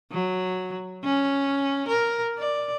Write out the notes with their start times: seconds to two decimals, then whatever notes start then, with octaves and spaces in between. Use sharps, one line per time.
0.12 F#3
1.04 C#4
1.88 A#4
2.38 D5